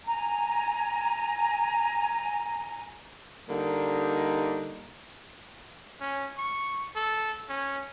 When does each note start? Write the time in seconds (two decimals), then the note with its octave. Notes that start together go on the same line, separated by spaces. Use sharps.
0.05 G#5 A#5
3.49 D3 G3 A#3 D#4
6.01 C#4
6.38 C#6
6.95 A4
7.49 C#4